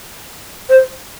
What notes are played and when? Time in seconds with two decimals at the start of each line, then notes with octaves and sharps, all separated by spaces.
0.69 C5